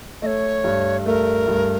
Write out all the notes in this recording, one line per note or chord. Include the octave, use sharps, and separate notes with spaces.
A3 C#5 D#5
G2
A3 A#4
G2